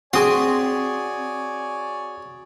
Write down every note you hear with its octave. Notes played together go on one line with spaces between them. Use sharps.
C4 F#4 G#4 C#5 D5 G#5 C6 D#6